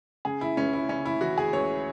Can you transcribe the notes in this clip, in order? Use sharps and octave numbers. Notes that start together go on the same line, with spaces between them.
C#3 G#4
E4
C#2 C#4
E4
C#3 C#4
E4
E3 F#4
G#4
C#2 C#5